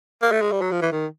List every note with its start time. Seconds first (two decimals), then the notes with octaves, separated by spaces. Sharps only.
0.22 A#3
0.31 A3
0.41 G#3
0.52 G3
0.61 F#3
0.71 F3
0.81 E3
0.92 D#3